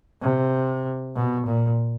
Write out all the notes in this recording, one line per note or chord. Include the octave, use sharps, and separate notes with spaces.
C3
B2
A#2